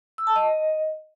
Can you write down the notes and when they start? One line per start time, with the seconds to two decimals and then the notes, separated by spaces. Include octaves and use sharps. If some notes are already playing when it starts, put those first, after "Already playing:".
0.18 E6
0.27 A5
0.36 D#5